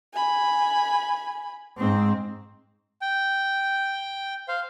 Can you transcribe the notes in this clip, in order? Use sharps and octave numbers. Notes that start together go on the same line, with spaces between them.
G#5 B5
G#2 C4
G5
C5 F5